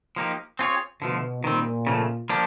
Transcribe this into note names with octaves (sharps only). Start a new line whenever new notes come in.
F3 A#3 D#4 G4
C4 F4 G#4 C#5
B2 D3 F3 A3
A#2 D#3 G3 C4
C#3 F3 A3
F3 A#3 D4 G4